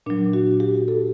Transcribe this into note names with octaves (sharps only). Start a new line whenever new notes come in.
A#2 F#3 D4
F#4
G4
A4